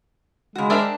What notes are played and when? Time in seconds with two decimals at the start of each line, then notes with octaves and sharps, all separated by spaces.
0.56 C#3 G#3 F#4
0.70 D4 G4 A#4 C5 D5 E5